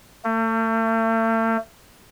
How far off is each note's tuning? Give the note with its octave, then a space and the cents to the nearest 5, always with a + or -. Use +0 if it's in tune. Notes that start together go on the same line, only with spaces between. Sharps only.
A3 +40